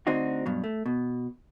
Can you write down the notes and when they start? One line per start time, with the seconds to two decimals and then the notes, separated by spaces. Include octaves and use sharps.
0.07 D2 D3 C4 D4 D#4 F#4
0.46 G2 B2 F#3
0.64 A3
0.86 B2